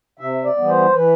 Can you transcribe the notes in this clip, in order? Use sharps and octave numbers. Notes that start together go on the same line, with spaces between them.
C3 E5
D5
E3 G3 B3
C5
E3 B4